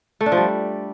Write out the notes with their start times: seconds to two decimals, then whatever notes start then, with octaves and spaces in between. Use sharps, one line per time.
0.21 A3
0.26 D4
0.32 F3
0.37 G3